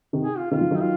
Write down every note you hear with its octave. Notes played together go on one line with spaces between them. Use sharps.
C3 D#3
G#4
F4
C3 D#3 F4
C#3 F3
D#3 F#3
D#4
F4